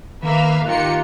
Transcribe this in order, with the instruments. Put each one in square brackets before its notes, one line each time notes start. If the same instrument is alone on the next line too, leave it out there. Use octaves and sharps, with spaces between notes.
[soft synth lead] D#3 [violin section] A#3 E5 F5 [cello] B4
[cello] D#3 F4 [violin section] A#3 G4 C#7 [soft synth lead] F#6